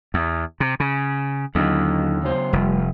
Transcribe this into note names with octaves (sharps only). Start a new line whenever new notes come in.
E2
C3
C#3
D#2 D3 F#3
C#3 F#3 C5
F1 G3